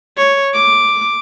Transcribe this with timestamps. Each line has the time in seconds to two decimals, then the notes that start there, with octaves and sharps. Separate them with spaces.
0.17 C#5
0.54 D6